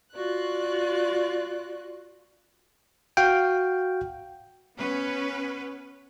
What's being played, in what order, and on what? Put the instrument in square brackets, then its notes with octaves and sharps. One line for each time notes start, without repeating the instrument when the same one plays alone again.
[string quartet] F4 F#4 D5 F#6
[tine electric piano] F#4 F5 G5
[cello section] B3 C#4 B4